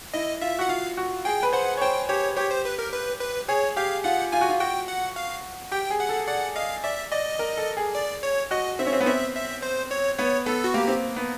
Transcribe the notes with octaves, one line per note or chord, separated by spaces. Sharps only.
E4 D#5
F4 E5
F#4 F#5
F4 F5
F#4
G#4 G5
B4
C5 F#5
C#5
C5 G5
G4 C#5
G4 C#5
C5
B4
A#4
B4
B4
G#4 C#5
G4 F5
F4 F#5
F4 G#5
F#4
F4
F#4 G5
F#5
F5
G4 G5
G#4
F#5
A4
D5 F#5
D#5 F5
D5 E5
D5 D#5
A#4
A4
G#4
D5
C#5
F#4 D#5
C4 E5
C#4
C4
B3
C4 E5
E5
C5
C#5
B3 C#5
B3 A4
F#4
A#3 G4
C4
B3